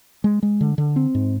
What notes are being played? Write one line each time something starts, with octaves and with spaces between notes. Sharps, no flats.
G#3
G#3
D3
D3
C4
G#2